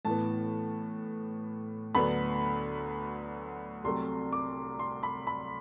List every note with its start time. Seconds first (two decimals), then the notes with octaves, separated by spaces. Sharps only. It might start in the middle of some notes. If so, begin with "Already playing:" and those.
0.05 A2 E3 B3 A5
1.95 D2 D3 F#3 B3 B5
3.84 C2 C3 F#3 A3 C6
4.33 D6
4.79 C6
5.03 B5
5.27 B5